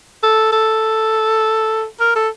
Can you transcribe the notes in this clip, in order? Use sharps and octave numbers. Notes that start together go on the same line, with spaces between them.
A4
A4
A#4
A4